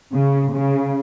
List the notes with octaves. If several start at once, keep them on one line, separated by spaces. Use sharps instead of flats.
C#3
C#3